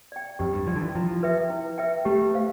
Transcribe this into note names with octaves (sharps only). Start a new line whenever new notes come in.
D5 G5
F2 G4
G2
F3 D5 G5
D3
E3
F3 E4
B4 E5 G5
E4
B4 E5 G5
A3 G4
C5 F5